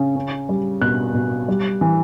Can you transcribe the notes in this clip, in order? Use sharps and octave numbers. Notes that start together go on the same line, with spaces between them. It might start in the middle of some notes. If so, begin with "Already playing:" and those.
Already playing: C#3
C#4
G3
B2 F#6
B2
G3
E3